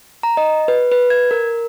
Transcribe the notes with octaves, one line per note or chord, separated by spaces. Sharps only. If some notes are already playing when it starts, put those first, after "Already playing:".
A#5
D#5
B4
B4
G#6
A#4